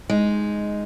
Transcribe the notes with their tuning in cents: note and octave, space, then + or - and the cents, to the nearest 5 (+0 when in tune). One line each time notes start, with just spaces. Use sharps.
G#3 +0 D#4 +0